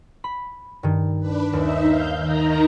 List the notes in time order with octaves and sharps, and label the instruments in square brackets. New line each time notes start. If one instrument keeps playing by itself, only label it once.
[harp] B5
G2 D#3
[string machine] D4 B4
[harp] D#2 [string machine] D#4 E5
[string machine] F5 G6
D#3 D#4 A#5